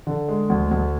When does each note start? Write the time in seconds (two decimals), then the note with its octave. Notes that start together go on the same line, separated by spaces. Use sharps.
0.07 D3
0.28 G#3
0.50 D2
0.71 D2